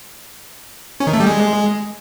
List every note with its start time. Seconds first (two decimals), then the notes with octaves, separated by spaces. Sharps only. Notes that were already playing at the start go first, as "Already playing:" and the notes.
1.00 C#4
1.07 D#3
1.13 A3
1.20 G3
1.27 G#3